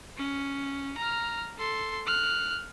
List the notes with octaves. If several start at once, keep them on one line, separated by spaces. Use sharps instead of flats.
C#4
A#5 F6
A4 C6
F6 F#6